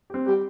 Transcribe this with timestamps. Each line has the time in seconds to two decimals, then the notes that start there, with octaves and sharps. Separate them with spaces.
0.10 C4 G4
0.26 G3 G4